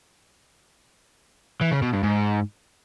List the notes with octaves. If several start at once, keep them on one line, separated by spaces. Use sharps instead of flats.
E3
C#3
B2
G2
G#2